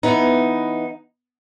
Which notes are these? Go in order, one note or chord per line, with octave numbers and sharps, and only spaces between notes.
E3 B3 D#4